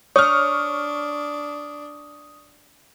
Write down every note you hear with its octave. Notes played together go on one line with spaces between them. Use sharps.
D4 C#5 C#6 D#6 F6